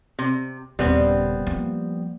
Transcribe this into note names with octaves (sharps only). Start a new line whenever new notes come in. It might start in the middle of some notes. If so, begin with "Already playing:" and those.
C3
D#1 C#3 G3 B3 C4
F3 A#3